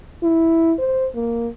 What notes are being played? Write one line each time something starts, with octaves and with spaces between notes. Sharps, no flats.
E4
C5
A#3